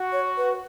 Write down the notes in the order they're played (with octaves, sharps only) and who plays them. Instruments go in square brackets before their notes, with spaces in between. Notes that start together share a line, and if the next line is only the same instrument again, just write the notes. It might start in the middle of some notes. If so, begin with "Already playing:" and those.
Already playing: [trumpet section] F#4
[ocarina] C#5
B4